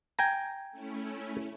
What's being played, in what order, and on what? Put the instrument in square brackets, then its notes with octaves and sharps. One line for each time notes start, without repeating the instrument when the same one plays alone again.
[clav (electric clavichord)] G5 G#5 A#5
[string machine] A3 C#4 E4